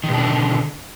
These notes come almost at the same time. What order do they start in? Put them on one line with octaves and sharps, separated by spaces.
D#3 B2 D4 D3